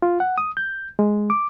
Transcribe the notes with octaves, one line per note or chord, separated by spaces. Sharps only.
F4
F#5
D#6
G6
G#3
D6